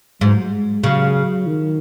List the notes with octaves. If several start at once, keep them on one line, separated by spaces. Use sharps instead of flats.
G#2 F#3
G#3
C#3 F#3
D#3